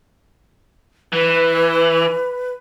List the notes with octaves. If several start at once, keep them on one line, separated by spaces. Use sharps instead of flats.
E3 B4